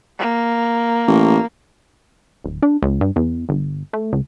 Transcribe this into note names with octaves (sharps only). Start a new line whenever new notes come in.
A#3
A1
D1
D4
C#2
G2
E2
G1
A3
C#2